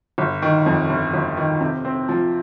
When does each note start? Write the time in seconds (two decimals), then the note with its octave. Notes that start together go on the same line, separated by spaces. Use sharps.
0.18 G1
0.42 D#3
0.66 F2
0.89 G1
1.13 G1
1.37 D#3
1.61 C3
1.85 C4
2.09 F3